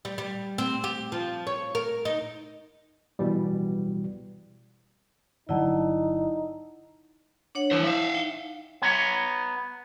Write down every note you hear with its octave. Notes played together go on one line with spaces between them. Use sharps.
G3
G3
C4
G4
F3
C#5
A#4
D#4
B2 E3 G3
G1 D3 F#3 D#4 E4 D5 F#5 A5
D4 C#5 F#5
E3 E4 C5
E5 F5
D#4
B3 C#5 A#5